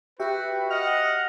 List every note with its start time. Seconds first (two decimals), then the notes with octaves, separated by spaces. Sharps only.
0.20 F#4 G4 B4 E5 G5
0.71 D#5 F#5 F6